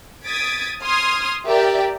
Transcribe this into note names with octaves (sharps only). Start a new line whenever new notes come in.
D#6 G#6 A6 B6 D7
C6 D#6 F6 G#6
G4 A#4 D5 E5 G5